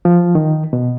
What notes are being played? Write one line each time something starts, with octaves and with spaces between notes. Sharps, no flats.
F3
D#3
B2